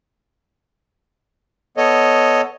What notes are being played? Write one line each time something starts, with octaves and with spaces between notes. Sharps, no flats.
B3 A4 C#5 D#5